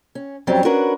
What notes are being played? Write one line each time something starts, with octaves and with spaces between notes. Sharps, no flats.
C#4
F2 F#3 G3 C4 C#4
C#4 D4 F#4 A#4 B4